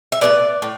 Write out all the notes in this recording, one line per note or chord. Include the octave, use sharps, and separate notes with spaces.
E5
A2 G3 B3 D5
A2